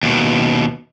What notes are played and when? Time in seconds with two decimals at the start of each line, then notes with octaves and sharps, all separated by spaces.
0.03 D#2 B2